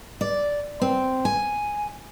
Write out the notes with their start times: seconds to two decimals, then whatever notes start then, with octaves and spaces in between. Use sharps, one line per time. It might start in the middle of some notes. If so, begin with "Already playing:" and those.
0.21 D5
0.82 C4
1.25 G#5